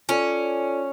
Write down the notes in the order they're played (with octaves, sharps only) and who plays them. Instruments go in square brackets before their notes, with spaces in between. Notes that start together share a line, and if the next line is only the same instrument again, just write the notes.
[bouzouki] C#4 [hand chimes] F4 A4 D5